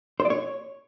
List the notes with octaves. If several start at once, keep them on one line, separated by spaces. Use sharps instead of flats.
C5
D5
C#5